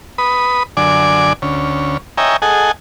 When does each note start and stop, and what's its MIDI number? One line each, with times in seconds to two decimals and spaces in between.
0.18 0.63 71
0.18 0.63 83
0.18 0.63 87
0.77 1.33 42
0.77 1.33 50
0.77 1.33 74
0.77 1.33 80
0.77 1.33 86
1.42 1.97 38
1.42 1.97 61
2.18 2.37 73
2.18 2.37 75
2.18 2.37 76
2.18 2.37 79
2.18 2.37 80
2.18 2.37 82
2.42 2.71 68
2.42 2.71 69
2.42 2.71 75
2.42 2.71 78
2.42 2.71 80